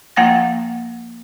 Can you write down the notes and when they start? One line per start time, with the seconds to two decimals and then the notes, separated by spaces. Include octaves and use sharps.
0.16 F3 A#3 F#5 G5 A6 A#6